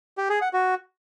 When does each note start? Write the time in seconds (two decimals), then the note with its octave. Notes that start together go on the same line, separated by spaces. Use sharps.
0.18 G4
0.29 G#4
0.41 F#5
0.53 F#4